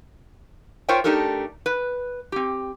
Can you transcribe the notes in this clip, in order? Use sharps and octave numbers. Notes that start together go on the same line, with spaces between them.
F4 A#4 C5 C#5 E5 G5
A3 D4 D#4 G4 A4 A#4
B4
C4 G4